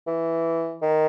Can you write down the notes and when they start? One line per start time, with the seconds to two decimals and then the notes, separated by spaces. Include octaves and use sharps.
0.07 E3
0.82 D#3